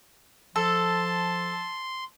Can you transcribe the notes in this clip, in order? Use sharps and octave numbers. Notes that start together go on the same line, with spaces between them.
F3 A4 A5 C6